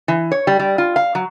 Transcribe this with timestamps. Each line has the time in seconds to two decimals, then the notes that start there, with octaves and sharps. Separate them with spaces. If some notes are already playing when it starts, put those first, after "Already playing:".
0.08 E3
0.32 C#5
0.47 G3
0.59 G3
0.78 F4
0.96 F5
1.15 F#3